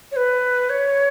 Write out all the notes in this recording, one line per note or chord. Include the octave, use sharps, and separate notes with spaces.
C#5
B4
C#5